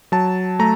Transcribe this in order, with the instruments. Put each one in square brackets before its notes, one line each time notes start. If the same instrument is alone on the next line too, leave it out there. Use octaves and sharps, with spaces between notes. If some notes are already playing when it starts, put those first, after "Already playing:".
[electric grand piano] F#3 A5
A3 A#5